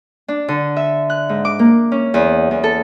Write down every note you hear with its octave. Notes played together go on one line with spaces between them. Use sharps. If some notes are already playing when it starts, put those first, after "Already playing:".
D4
D3
E5
F#6
G#2
D6
A#3
C#4
E2
E2
A4